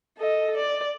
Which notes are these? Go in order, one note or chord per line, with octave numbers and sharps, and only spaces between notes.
A4 D#5
D5